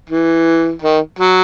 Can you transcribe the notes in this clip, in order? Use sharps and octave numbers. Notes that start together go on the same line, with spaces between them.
E3
D#3
F#3